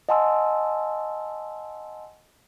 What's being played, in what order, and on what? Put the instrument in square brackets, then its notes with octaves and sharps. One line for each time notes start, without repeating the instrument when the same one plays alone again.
[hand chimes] D#5 F#5 G#5 A5 C6 E6